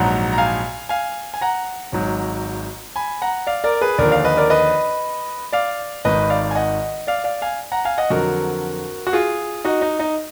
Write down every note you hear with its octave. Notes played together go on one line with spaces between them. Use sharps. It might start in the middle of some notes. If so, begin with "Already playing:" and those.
Already playing: A#1 G#2 F#3 F#5 A#5
A#5
F5 G#5
F5 G#5
G#5
F#5 A#5
G#1 G#2 F#3
G#5 B5
F#5 A#5
D5 F5
A#4 D5
G#4 B4
D#2 D3 F3 A#4 D5
D5 F5
B4 D#5
A#4 D5
B4 D#5
D5 F5
G#1 G#2 D#3 B4 D#5
D5 F5
G#5
D#5 F#5
D5 F5
D5 F5
F5 G#5
F#5 A#5
F5 G#5
D#5 F#5
F2 D3 F#3 F#4 A#4
F#4
F4 G#4
D#4 F#4
D#4
D#4